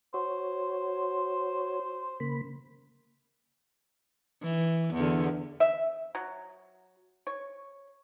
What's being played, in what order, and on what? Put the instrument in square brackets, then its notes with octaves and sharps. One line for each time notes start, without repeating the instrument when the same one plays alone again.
[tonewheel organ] F#4 C#5 [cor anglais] C5
[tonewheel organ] C#3 A#3 B5
[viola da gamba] E3
E2 D3
[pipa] E5
F#3
C#5